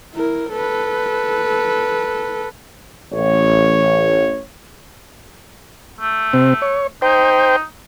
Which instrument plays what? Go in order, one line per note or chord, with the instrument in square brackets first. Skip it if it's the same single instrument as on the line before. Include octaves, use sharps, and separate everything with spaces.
[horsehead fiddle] E4 A#4
A4 B4
[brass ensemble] A1 C#5
[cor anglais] A3
[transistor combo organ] C3 C4
C#5
[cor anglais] D#4 [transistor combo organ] C5 G5